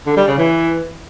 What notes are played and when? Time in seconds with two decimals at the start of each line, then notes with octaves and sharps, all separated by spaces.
0.06 D3
0.17 G3
0.27 C#3
0.38 E3